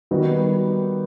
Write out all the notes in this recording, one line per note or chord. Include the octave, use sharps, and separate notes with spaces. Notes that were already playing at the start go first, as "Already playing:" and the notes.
D#3 G3 B3 D#4 F#4